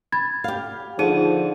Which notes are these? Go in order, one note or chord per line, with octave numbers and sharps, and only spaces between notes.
B5 G#6 A6
G4 F5
D3 F3 D#4 G#4 D#7